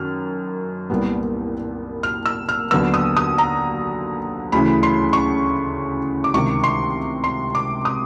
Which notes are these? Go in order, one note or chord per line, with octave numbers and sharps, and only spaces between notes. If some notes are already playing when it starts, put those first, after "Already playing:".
Already playing: F#2 D#3 F6
C2 A#2 G3 B3
F6
E6
F6
D#2 D3 F#3 B3 E6
D#6
D#6
A#5
D2 C#3 E3 B5
C6
C#6
D6
C#2 C3 D#3 C#6
C6
C6
D6
D#6